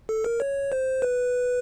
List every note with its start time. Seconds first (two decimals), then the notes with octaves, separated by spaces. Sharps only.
0.09 A4
0.24 A#4
0.40 C#5
0.72 C5
1.02 B4